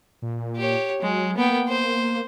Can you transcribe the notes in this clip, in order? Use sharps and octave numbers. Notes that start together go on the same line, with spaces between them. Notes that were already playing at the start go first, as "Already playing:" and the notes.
A#2
G4 C#5
F#3 G#3
A#3 B3 G5
C5